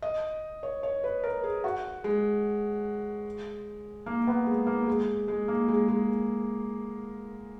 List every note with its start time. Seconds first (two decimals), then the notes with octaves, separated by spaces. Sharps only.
0.02 D#5
0.63 C#5
0.83 C#5
1.04 B4
1.24 A#4
1.44 G#4
1.64 F#4
2.04 G#3
4.06 A#3
4.27 B3
4.47 G#3
4.67 A#3
4.87 G#3
5.28 G#3
5.48 A#3
5.68 G#3
5.88 G#3